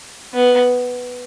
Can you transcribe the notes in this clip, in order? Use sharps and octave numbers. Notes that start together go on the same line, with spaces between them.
B3